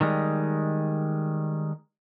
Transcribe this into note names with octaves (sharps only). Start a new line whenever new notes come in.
D#3 G3 G#3